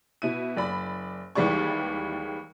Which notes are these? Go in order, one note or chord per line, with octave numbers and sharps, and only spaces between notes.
B2 E4 D#7
F#1 D5 B5
D#2 E3 G3 G#3 D5 C#6